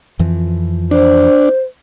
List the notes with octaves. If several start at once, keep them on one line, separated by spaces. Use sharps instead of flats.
F2 E3 F3
D4 C5